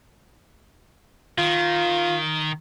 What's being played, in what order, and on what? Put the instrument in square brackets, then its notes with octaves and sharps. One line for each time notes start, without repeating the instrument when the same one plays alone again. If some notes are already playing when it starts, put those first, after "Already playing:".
[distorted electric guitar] D#3 [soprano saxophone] F4